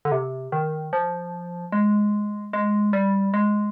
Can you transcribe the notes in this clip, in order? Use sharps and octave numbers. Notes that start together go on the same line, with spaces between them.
D3
C3
D#3
F3
G#3
G#3
G3
G#3